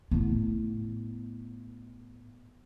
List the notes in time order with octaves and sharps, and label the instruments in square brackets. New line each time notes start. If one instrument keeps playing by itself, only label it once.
[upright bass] A2 B3